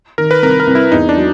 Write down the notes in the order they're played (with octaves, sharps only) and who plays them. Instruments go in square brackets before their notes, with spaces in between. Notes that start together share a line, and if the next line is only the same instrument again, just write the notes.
[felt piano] D#3 [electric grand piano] A#4
[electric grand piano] B4
[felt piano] C2 [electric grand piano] A#4
[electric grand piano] A#4
[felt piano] C2
[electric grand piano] E4
[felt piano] E2 [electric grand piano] D#4
[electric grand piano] D4
[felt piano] F#3